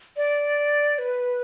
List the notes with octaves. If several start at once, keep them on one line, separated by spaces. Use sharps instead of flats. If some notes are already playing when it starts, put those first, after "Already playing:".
D5
B4